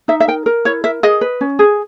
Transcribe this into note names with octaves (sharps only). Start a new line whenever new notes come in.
D#4 E5
E5
A#4 G5
A#4
E4 C#5
A#4 E5
G#4 D#5
B4
C#4
G#4